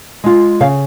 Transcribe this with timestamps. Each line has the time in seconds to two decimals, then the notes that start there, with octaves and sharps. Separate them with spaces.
0.24 G#3 F4
0.61 C#3 F5